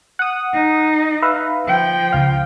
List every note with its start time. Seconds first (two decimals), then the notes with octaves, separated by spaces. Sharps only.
0.19 F#5 D#6
0.53 D#4
1.22 B4 E5 F5
1.66 F3 G5
2.12 C#2 F5